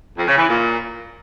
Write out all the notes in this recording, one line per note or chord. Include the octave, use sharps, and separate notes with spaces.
F2
C#3
E3
A#2